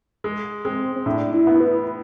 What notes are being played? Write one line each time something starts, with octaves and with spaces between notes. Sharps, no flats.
G#3
G#3 C4
C4
A2 D4
E4
B3
B4